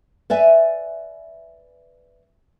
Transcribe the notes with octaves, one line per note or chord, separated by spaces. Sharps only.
B4 D5 E5 G#5